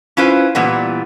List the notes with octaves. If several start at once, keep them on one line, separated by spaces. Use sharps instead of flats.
C#4 E4 F4 B4 C5
A#2 E3 G3 B3